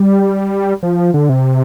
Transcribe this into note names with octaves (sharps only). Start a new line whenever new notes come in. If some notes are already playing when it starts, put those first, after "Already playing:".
Already playing: G3
F3
D3
C3